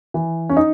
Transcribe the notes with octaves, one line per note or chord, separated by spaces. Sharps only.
E3
C#4
D#4